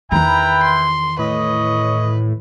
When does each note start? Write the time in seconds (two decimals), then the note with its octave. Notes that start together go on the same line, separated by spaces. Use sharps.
0.12 E2 D#3 E4 B4 G5 A#5
0.63 C6
1.19 A2 B4 C#5 D#5